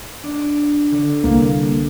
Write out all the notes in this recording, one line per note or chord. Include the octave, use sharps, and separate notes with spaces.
D4
D3
C2 A#3